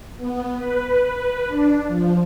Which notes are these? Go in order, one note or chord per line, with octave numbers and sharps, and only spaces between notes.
B3
B4
B4
D4
F3